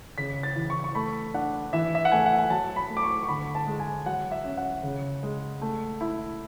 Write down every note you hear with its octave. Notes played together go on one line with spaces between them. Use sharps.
C#3 B6
A6
E3
C#6
C#6
A3 B5
D4 F#5
E3 E5
E5
F#5
A3 G#5
F#5
G#5
F#3 A5
B5
A3
D6
C#6
C#6
D3 B5
A5
G#3
G#5
F#3 F#5
E5
C#4
F#5
C#3
G#3
A3
E4